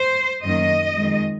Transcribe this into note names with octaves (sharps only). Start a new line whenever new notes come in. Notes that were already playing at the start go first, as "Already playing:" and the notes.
Already playing: C5
F#2 D#3 A#3 D#5
F2 D#3 G#3